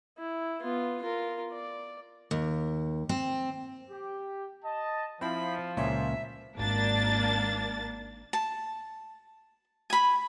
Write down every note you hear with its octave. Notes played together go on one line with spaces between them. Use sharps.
E4
B3 F4
F4 A#4
D5
D#2
C4
G4
D#5 A5
F3 C4 E4 B5
C#2 A#2 C#4 E5
G#1 A#3 D4 A6
A5
G#5 B5